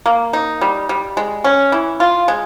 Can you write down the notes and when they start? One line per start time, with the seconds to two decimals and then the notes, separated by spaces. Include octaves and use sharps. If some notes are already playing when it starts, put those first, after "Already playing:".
0.06 A#3
0.33 D#4
0.61 G3
0.89 G3
1.17 G#3
1.44 C#4
1.72 E3
2.00 F4
2.28 G#3